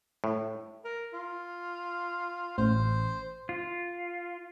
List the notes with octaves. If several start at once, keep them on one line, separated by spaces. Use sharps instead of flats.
A2
A#4
F4
A1 C5
F4